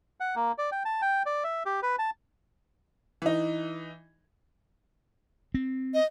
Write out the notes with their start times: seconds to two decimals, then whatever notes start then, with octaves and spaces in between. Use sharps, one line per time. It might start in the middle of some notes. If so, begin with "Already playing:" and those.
0.20 F#5
0.36 A#3
0.58 D5
0.72 G5
0.85 A5
1.02 G5
1.26 D5
1.44 E5
1.66 G4
1.83 B4
1.99 A5
3.22 E3 D#4
5.54 C4
5.94 D#5